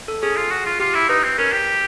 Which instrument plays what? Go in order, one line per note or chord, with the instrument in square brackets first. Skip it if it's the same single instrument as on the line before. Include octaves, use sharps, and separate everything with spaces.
[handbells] A4
[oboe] C#4 [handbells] G#4
[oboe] F4
F#4
F4
[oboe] F4 [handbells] G4
[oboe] E4
[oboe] D#4 [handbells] B4
[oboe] C4
[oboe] C#4 [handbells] A#4
[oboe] G4